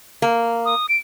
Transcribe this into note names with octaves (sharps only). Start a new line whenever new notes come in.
A#3
D#6
D7